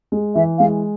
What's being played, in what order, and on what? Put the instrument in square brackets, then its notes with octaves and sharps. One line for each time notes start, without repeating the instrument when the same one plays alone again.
[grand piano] G#3
[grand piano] E3 [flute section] E5
[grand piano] G#3 [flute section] F5